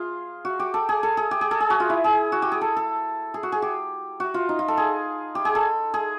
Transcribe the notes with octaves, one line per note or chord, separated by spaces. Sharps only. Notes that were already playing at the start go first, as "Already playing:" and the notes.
Already playing: F4 G#4
F#4
G4
A4
G#4
A4
G#4
G4
G#4
A4
G#4
F#4
F4
E4
G#4
F#4
G4
G#4
A4
A4
G#4
F#4
G#4
G4
F#4
F4
D#4
F4
A4
G#4
G4
G#4
A4
G#4